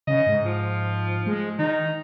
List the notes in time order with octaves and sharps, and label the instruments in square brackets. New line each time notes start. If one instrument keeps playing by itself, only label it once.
[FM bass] C#3 [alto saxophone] D#5
[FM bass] G#2
[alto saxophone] F3
[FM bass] G#3
[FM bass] D#3 [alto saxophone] D#4